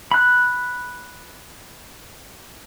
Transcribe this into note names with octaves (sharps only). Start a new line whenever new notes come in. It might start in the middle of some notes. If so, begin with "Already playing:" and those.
B5 F#6